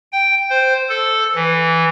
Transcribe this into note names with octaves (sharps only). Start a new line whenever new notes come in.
G5
C5
A4
E3